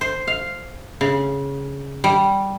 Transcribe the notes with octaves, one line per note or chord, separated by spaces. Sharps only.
C5
F5
C#3
G3